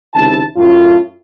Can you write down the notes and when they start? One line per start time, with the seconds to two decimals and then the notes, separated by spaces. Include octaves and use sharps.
0.13 C#2 C3 D#3 E4 A5
0.56 F#2 A2 F4